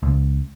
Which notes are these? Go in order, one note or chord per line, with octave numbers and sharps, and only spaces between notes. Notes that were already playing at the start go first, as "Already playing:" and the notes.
C#2